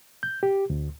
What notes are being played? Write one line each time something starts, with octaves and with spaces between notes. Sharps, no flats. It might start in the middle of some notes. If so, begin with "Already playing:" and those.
G6
G4
D2